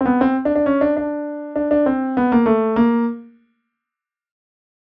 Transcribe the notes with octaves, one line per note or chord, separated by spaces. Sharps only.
C4
B3
C4
D4
D4
C#4
D4
D4
D4
D4
C4
B3
A#3
A3
A#3